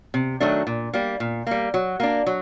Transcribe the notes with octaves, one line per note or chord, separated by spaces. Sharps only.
C3
D#3 F#3 A3 D4
A#2
G3 A#3
A#2
G3 A#3
F#3
A#3 D4
F#3